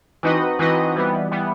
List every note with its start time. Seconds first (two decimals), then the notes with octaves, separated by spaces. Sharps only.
0.23 E3 C4 D#4 F#4 B4 D#5
0.59 E3 C4 D#4 F#4 B4 D#5
0.95 E3 G3 B3
1.31 E3 G3 B3